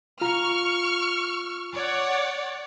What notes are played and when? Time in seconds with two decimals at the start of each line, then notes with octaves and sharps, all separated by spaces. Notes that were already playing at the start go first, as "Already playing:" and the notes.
0.21 F4 A#5 C#6 F6
1.75 C#5 D5 F#5